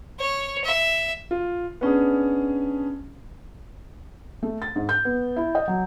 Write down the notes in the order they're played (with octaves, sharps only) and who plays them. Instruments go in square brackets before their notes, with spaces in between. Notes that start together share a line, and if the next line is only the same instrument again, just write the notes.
[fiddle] C#5
E5
[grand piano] F4
B3 C#4 D4 G#4
[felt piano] A3
A6
G#2
G6
B3
E4
D#5
F#3